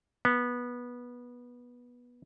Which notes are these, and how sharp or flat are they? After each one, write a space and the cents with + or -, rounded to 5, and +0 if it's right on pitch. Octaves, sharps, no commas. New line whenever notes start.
B3 -15